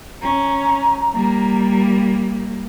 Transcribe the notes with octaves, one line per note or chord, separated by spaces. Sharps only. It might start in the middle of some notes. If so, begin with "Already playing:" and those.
C#4 A#5
G3 A#3